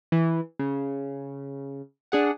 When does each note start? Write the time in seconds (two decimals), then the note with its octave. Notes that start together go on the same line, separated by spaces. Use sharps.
0.12 E3
0.59 C#3
2.12 D4 G#4 F#5